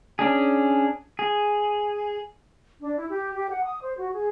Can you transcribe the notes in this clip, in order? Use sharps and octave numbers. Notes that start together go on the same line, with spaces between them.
C#4 D4 G#4
G#4
D4
E4
G4
G4
F#5
D#6
C5
F#4
G#4